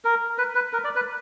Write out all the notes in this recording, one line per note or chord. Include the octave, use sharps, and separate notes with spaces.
A#4
B4
B4
A#4
D5
B4